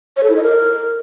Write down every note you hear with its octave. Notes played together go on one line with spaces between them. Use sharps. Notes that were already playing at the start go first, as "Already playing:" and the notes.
C#5
A4
E4
D#5
A#4